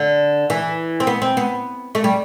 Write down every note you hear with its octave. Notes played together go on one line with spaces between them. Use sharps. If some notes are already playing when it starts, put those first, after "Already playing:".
Already playing: D3
E3
C4
B3
C4
B3
A3
G3